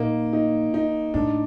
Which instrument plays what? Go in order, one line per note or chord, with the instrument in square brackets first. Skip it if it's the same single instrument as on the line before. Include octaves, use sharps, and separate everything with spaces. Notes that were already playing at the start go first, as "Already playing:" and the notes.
Already playing: [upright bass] A#2 [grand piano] A#3 D#4
[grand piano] D#4
D#4
[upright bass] A2 [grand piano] D4